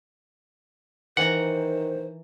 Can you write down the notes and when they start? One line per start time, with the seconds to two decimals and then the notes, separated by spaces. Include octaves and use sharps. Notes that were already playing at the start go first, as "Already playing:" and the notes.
1.17 D#3 E3 C5 F#5 G#5 A#5